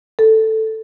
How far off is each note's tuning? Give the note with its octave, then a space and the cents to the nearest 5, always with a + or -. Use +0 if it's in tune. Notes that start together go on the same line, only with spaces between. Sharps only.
A4 +5